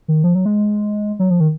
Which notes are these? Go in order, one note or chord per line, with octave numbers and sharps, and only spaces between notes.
D#3
F3
F#3
G#3
F#3
F3
D#3